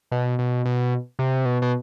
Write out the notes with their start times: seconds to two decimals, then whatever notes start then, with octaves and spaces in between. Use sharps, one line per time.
0.12 B2
0.39 B2
0.65 B2
1.19 C3
1.45 B2
1.62 B2